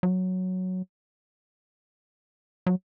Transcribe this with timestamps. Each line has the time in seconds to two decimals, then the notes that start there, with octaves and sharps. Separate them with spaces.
0.03 F#3
2.67 F#3